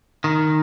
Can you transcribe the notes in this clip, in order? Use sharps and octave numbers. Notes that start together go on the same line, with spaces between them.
D#3